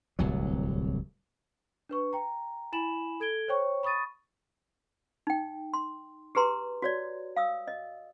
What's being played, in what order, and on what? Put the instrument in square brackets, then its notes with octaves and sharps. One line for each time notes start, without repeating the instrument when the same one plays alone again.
[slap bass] D1 C2 F#3
[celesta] D4 B4 C#6
G5 A#5
E4 G#5 B5 E7 F#7
A4 G#6 D7 G7
C5 C#5 G5 C#6
B5 C#6 D#6 A6 D#7
[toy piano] D#4 G5
C6
G4 G#4 B4 A#5 C6
F#4 C#5 D5
F5 D#6 E6
D#5